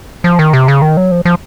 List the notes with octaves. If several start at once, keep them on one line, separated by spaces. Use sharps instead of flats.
F3
D#3
C3
C#3
D#3
F#3
F3
F3